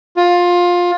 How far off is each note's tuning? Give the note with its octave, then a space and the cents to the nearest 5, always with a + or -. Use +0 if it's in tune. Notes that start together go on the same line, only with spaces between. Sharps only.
F4 +15